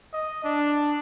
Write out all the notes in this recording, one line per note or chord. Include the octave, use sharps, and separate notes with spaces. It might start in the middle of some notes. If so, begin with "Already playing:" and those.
D#5
D4